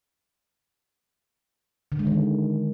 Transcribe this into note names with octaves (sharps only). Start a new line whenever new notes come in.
D3
G#3
D#3